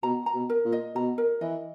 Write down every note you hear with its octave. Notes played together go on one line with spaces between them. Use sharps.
B2 A#5
A#5
B2
A#4
A#2
D#5
B2 A#5
A#4
E3 D#5